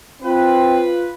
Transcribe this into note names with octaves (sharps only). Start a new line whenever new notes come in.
C4 F4 B4